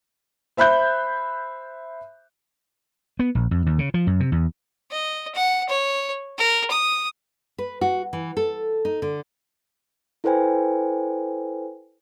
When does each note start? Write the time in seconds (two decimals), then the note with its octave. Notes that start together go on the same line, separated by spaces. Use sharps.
0.57 C5 E5 B5 F#6 G6
3.19 B3
3.35 A#1
3.51 F2
3.66 D#2
3.79 C#3
3.94 F3
4.07 F#2
4.20 C3
4.32 E2
4.91 D#5
5.35 F#5
5.68 C#5
6.38 A#4
6.70 D#6
7.58 B4
7.81 F#4
8.13 E3
8.37 A4
8.85 D#4
9.02 D3
10.24 E4 A4 B4 C5 G5 G#5